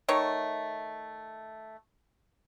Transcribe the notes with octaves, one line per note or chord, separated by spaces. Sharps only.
D#3 A3 C#5